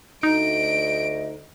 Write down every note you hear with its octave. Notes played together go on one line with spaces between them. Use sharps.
D2 D#4 D#5 D7